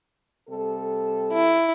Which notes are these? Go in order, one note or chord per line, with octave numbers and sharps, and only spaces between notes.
C3 G3 A4
E4